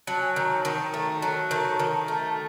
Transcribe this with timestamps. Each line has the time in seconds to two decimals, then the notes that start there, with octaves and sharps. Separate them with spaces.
0.07 F#3 A5
0.21 G#5
0.36 D#3 A#5
0.50 A5
0.65 D#3 A5
0.93 A3 A#5
1.22 F#3 A5
1.51 D#3
1.79 D#3
2.08 A3